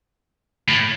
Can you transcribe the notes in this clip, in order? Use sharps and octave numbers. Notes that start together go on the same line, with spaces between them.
A2